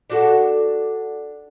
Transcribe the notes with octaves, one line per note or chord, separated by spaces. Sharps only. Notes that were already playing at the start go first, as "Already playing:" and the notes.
D4 F#4 A4